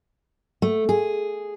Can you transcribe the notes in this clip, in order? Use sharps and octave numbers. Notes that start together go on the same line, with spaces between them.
A3
G#4